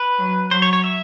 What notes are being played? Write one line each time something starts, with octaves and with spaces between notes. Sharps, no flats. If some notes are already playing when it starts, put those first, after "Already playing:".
Already playing: B4
F#3
F#3 C5
C#5
C#5
E5